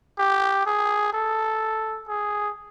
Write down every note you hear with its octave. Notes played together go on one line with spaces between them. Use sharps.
G4
G#4
A4
G#4